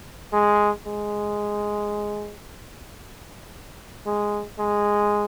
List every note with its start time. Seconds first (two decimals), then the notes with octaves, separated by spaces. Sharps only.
0.33 G#3
0.86 G#3
4.06 G#3
4.59 G#3